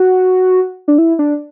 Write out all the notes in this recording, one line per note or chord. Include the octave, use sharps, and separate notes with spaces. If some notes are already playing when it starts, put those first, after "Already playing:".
Already playing: F#4
D4
E4
D4